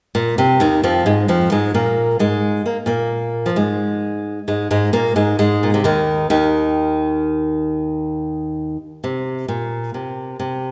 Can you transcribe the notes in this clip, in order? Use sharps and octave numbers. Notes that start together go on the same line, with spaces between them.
A#2
C3
D#2 D#3
F2 F3
G#2 G#3
F2 F3
G#2 G#3
A#2 A#3
G#2 G#3
A#3
A#2 A#3
F3
G#2 G#3
G#2 G#3
G#2 G#3
A#2 A#3
G#2 G#3
G#2 G#3
A#2
C3
D#2 D#3
D#2 D#3
C3
A#2
C3
C3